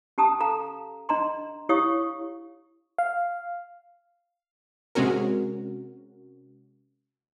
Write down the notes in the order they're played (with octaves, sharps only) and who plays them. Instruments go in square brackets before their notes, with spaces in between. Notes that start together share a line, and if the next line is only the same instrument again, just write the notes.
[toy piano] C#4 G4 A5 A#5 D#6
A4 F5 A#5
D4 D#5 A#5 C6
E4 G4 C#5 F5 C#6 D#6
[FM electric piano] F5
[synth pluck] C3 G#3 C4 C#4 F#4 A#4